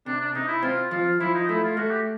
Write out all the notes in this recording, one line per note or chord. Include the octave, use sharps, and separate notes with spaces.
C3 D4
D4
C3 D#4
E4
C4 F4
F3 F4
F3 E4
D#4
A3 E4
F4
A3 F#4
G4